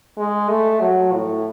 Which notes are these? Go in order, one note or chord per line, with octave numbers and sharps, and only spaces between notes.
G#3
A3
F#3
A2